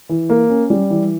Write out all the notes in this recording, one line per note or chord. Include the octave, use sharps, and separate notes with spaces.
E3
A#3
C#4
G3
E3